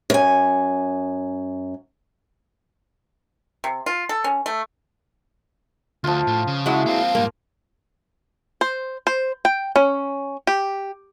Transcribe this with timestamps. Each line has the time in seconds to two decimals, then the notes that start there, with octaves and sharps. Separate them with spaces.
0.10 F#2 G#5
3.64 C3
3.86 F4
4.09 A4
4.24 C#4
4.46 A3
6.04 D2 F3 F4
6.27 A2
6.47 C#3
6.66 F#3 G#3 E4 F#5
6.86 A#3 C4 F5
7.15 G#2 G3 A#3
8.61 C5
9.07 C5
9.45 G5
9.76 C#4
10.47 G4